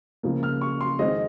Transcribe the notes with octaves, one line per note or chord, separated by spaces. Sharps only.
C#2 C#3 F3 A#3
F6
C#6
C6
F2 D#3 G#3 C4 D#5